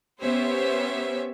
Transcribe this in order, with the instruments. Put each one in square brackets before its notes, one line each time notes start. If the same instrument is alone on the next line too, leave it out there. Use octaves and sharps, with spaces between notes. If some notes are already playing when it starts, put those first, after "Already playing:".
[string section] B3 C#4 G4 C5 C#5 E5